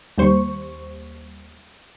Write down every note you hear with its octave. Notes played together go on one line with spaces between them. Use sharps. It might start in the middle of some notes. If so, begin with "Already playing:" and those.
D#2 G3 C5 C#6